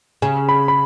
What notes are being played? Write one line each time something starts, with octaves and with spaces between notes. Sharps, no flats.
C#3 G#5
B5
B5